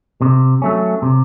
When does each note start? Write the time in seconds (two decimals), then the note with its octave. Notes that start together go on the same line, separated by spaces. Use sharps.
0.22 C3
0.62 F#3 A3 C#4
1.02 C3